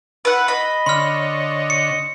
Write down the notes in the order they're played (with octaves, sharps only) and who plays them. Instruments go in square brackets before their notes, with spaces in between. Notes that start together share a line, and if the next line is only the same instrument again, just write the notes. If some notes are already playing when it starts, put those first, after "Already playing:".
[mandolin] B4 F#5 [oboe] E5
[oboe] D#5 [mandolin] B5
[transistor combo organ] D3 C#5 [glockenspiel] C6 F6
[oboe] D#5 [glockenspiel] C#7